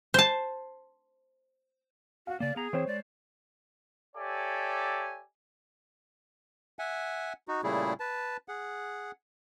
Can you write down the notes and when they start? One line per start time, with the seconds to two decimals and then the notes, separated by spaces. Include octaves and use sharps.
0.14 C5 A5
2.27 F#4 F5
2.40 C#3 A#3 D5
2.56 B3 G#4 A#5
2.73 E3 C4 C5 C#5
2.87 G#3 D5
4.16 G4 A4 C#5 D5 E5 G#5
6.79 E5 F#5 G#5
7.48 D#4 F#4
7.64 A#2 C#3 G3 A3 E4 G#4
8.00 B4 A5
8.48 G#4 F#5